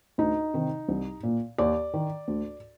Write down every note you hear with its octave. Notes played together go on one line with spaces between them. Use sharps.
D2 D#4
C3 D#3
C2
A#2
D#2 D5
D#3
D2